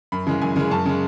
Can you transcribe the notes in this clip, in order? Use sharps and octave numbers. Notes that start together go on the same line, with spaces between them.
F#2 B5
C#3 E3 G#3
F#2 G#5
C#3 E3 G#3
F#2 A5
C#3 G#3